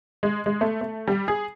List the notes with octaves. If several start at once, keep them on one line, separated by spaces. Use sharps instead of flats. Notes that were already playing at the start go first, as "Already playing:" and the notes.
G#3
G#3
A3
A3
G3
G#4